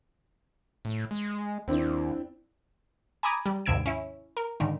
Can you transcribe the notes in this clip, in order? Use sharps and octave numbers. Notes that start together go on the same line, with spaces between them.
A2
G#3
D#2 C4 D4 E4
G#5 A#5 B5 D6 D#6 G#6
G3
D#2 G#2 C3 E6 G#6 D7
C#4 E4
A#4
G#2 D3 D#3